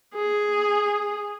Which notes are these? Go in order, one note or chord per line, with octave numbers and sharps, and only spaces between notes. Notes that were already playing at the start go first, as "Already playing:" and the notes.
G#4